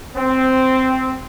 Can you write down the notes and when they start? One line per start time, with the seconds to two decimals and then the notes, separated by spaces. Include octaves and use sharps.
0.17 C4